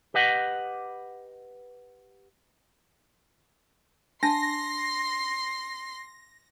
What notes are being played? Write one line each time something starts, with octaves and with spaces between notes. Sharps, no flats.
G4 B4 D#5 F#5
D4 G#5 A5 C6 A#6 C7